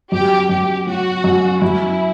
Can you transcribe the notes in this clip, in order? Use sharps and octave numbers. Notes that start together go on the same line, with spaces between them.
F#2 G4
F#2 G4
F#3 F#4
F#2
F#2 E4